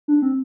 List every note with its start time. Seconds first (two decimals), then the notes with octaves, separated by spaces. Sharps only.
0.08 D4
0.22 C4